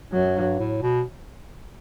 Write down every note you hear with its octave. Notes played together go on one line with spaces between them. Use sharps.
F#2 F#3
G2
A2
B2